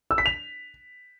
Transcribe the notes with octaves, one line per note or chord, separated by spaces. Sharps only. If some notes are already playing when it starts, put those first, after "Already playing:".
E6
B6
F7